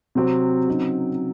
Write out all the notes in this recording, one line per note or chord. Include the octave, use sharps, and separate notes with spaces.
C3 F#3 C4 F#4
C#3 F#3 C4 D#4